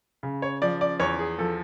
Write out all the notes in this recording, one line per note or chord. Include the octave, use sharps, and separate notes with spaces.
C#3
C#5
F3 D5
D5
E2 C#5
G#4
F3 A4